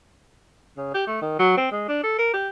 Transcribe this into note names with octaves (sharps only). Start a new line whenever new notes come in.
C#3
G4
A3
D#3
F#3
C4
G#3
D4
A4
A#4
G4